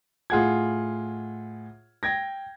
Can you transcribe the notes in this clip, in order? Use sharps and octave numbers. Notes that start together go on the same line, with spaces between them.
A2 F4 G#4 F#5 G#6
G5 G#6 A#6